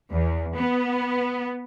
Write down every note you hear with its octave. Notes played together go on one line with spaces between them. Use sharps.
E2
B3